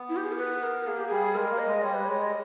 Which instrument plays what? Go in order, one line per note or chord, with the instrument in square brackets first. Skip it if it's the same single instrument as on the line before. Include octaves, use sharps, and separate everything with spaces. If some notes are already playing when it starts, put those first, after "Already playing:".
Already playing: [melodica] B3
[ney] E4
G4
G#4
A#4
B4
A#4
[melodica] A#3 [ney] G#4
[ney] G4
[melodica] G3 [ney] G#4
[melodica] G#3 [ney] A#4
[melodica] A#3
[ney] D#5
[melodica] G#3
[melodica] G3 [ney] C#5
[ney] B4
[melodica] G#3 [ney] C#5
[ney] D#5